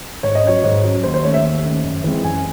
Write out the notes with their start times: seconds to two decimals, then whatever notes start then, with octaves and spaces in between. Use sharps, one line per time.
0.23 G#2 C#5
0.35 D#5
0.43 F#3 C#4 C#5
0.64 G#2
0.84 F#3 C#4
1.03 D#2 C5
1.14 C5
1.23 D#3 A3 C#4 C#5
1.34 E5
1.44 D#2
1.64 D#3 A3 C#4
1.84 F#2
2.04 E3 G#3 C4
2.24 F#2 G#5